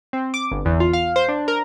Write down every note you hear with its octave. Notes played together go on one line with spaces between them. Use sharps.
C4
D6
G1
E2
F4
F5
C5
D4
A#4